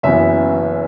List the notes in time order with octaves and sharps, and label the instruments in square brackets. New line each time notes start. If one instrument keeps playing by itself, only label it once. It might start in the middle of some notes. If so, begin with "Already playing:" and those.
[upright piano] F#1 F#2 E3 B3 E5